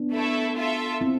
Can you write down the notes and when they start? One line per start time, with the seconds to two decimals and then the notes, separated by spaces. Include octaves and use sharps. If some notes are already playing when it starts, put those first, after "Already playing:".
Already playing: B3 D4
0.12 A3 E4 A4 E5
0.57 F4 A4 E5
1.01 C4 E4